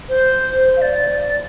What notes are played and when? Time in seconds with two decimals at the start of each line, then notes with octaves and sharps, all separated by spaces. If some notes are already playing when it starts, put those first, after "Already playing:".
0.09 C5
0.77 F5
0.82 D5